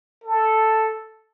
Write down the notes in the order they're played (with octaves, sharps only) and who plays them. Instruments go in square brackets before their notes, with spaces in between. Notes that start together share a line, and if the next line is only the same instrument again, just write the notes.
[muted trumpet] A4